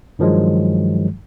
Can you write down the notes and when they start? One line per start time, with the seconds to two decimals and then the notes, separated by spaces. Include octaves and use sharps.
0.19 G2 D#3 F3 F#3 G#3